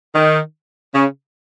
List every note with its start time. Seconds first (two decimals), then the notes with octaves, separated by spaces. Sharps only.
0.14 D#3
0.93 C#3